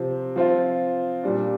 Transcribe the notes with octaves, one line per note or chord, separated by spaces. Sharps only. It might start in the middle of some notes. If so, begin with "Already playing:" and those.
Already playing: C3 F3 C4
F3 C4 F4
A#2 G3 D4